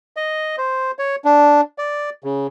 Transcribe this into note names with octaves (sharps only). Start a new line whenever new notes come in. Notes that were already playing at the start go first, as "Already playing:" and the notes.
D#5
C5
C#5
D4
D5
C#3